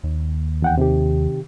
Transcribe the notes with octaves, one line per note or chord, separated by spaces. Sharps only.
D#2
E2 F#5 G5
C3 D#3 G4